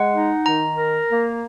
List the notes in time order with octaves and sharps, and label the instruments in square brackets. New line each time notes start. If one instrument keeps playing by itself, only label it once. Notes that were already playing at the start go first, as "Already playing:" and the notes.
Already playing: [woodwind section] G#3 [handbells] F#5
[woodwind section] D#4
[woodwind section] D#3 [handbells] A#5
[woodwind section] A#4
A#3